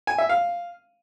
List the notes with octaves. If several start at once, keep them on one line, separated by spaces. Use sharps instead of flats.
G#5
E5
F5